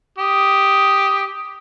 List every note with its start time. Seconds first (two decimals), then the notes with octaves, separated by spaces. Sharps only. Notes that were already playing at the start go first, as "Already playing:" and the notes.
0.19 G4 D#6